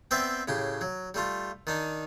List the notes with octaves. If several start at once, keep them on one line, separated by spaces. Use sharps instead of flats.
B3 C4 C5 D5 E5 G5
A2 C#3 G4
F#3
G3 A3 F4
D#3 D4 D#4